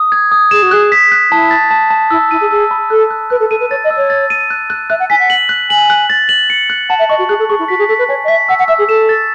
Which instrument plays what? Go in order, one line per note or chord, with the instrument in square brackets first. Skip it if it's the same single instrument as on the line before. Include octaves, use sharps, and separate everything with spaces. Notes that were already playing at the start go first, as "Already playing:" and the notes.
Already playing: [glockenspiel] D#6
G#6
D#6
[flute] G#4 [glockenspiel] E7
[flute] F#4
[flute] G#4 [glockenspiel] F#6
[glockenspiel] B6
F#6
[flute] E4 [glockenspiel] A5
[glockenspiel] A6
A5
A5
[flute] E4 [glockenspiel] E6
[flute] E4 [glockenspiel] D#7
[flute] G#4
[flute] G#4 [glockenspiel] E6
[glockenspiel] B5
[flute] A4 [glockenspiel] F#6
[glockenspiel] F#6
[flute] B4 [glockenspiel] F#6
[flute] A4
[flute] A4 [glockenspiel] D#7
[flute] B4
[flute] C#5 [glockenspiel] A6
[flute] D#5
[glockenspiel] E6
[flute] C#5
[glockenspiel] A6
D#7
F#6
F#6
[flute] E5 [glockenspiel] F#6
[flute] F#5
[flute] G#5 [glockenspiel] B6
[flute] F#5
[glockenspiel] F#7
F#6
[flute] G#5 [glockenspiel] F#7
[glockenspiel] F#6
A6
F#7
C#7
F#6
[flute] F#5 [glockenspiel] A5
[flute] E5
[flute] D#5 [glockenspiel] C#6
[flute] F#4
[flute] G#4 [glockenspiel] F#6
[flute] A4
[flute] G#4 [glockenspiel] C#6
[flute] E4
[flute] F#4 [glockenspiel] B6
[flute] G#4
[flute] A4 [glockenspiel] B6
[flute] B4
[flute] C#5 [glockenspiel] G#5
[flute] D#5
[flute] E5 [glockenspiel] B6
[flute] F#5 [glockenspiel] E6
[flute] F#5
[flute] E5 [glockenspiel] E6
[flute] G#4
[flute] A4 [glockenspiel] E7
[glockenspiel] A6